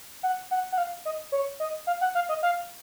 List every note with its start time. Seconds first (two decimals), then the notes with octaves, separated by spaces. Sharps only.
0.23 F#5
0.51 F#5
0.72 F#5
0.78 F5
1.05 D#5
1.32 C#5
1.60 D#5
1.87 F5
2.01 F#5
2.15 F5
2.29 D#5
2.43 F5